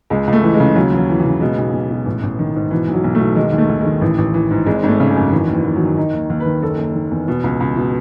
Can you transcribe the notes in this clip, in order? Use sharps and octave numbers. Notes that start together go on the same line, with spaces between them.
C#2 G#3
C#2
A3
E3
G#3
C#3
D#2 F#3
D#2 F#3
E3
E3
C#3
B2 G#3
B1
B1
B2
A1
A1
D#3
G#2
B2 E3
B1
F#3
B1
B2 A3
D#3 G#3
D#2
A3
D#2
D#3 G#3
A1 E3
A1
E3
G#2
G#1 G#3
G#1
A3
C#3
G#3
F#2
D#3 E3
D#2
E3
D#2
F#3
D#3
D#3 D#4
D#2
D#2
B4
D#3
F#1 A4
F#1
D#3
E2
B2
C#2
C#2
B2